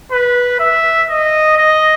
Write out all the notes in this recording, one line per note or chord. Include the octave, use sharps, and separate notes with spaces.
B4
E5
D#5
D#5